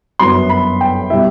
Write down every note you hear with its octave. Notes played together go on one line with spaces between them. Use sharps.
G1 F#2 F#3 B3 C6
B5
G5
B2 G3 E5